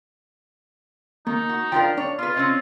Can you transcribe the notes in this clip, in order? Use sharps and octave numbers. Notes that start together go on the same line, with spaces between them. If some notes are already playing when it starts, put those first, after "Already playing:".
D#3 A#3 D#4
F#4
F3 D4 A#4 F5 G5
D4 C#5
B3 F4 B4
C4 C#4 D#5